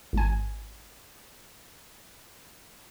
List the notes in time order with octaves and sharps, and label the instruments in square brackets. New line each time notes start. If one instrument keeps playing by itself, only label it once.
[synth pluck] G#1 G#5